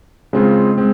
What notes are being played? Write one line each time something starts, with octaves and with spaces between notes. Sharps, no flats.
C#3 G#3 C4 F4
G#3 C4